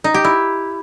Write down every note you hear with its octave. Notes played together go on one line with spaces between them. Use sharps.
D#4
G4
E4